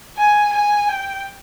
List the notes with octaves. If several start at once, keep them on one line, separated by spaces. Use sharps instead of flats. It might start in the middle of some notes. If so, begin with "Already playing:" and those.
G#5
G#5
G5